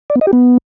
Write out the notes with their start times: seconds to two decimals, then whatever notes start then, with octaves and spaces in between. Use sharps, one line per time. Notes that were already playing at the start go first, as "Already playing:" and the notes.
0.10 D5
0.15 B3
0.21 D#5
0.27 G4
0.33 B3